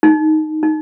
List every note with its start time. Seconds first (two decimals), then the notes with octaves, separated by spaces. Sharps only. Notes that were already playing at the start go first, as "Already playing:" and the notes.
0.03 D#4
0.63 D#4